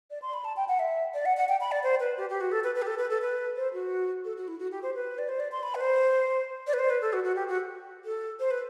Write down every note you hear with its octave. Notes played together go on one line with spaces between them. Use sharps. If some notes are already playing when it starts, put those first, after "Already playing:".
D5
C6
B5
A5
G5
F#5
E5
D5
F#5
F#5
G5
B5
D5
C5
B4
G4
G4
F#4
A4
B4
B4
G4
A4
B4
A4
B4
C5
F#4
A4
F#4
E4
F#4
G4
C5
B4
D5
C5
D5
C6
B5
B4
C5
D5
B4
C5
B4
A4
F#4
F#4
G4
F#4
A4
C5
B4